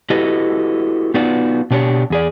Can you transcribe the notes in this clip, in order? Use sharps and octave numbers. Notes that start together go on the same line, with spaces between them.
E4 F#4 G4 A4 B4 D#5
B3 D#4 F4 F#4 B4 D5
B2 D4 G4 C#5
E2 G#4 D5